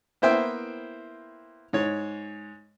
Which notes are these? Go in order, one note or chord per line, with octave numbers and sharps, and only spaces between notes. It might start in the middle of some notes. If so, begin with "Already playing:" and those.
A#3 B3 E4 C5 E5 G5
G#2 C#5